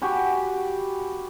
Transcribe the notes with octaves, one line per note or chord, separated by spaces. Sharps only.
F#4 G4 G#5 B5